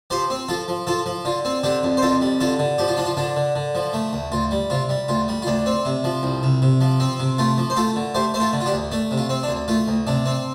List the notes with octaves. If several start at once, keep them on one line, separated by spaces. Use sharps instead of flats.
F3 G4 C5
C4
F3 F4 A4
F3
F3 F4 A4
F3
D3 F4
C4
D3 D4 G4
F2
C5
F2 F4 A4
G3
D3 F4 A4
D3
F3 G4
F4
F3 D4
F4
D3 D4
D3
D3
F3
A3
D2
D2 F4
G3
C3 F4
G3
D2 F4
G3
F4
D2 D4
C4
C3
F3
C2
C3
C3
F3
C4
C3
A3 F4
F3
C5
A3 F4 A4
D3
A3 G4 C5
A3 C5
F4 A4
D3
F4
D4 G4
D2
A3 D4
C3
F4
C4
D4
D2
A3 F4
D2
C3 D4
C4